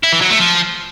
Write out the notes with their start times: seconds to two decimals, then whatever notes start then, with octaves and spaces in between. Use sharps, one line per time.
0.04 E4
0.13 E3
0.22 F#3
0.31 A3
0.40 F3